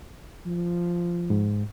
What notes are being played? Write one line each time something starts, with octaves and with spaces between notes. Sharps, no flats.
F3
G#2